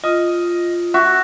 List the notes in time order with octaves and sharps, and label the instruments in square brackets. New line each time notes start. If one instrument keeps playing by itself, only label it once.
[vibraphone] F4 [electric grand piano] D#5 D#6
[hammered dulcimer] F#4 [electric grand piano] E5